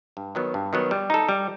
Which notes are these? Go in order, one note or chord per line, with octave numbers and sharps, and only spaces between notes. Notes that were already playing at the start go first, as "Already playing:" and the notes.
G2
D#3 F#3 B3
G2
D#3 F#3 B3
G3
D#4 A4
G3